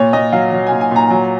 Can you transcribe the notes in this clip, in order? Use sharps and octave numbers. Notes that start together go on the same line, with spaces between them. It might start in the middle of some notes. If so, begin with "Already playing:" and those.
Already playing: A#2 C#5
A#2 D#5
F#3 F5
F#3
A#2 G#5
G#5
A#2 A#5
F#3